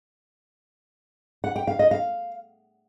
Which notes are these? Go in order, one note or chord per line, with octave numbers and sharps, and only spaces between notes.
F#5
G5
F5
D#5
F5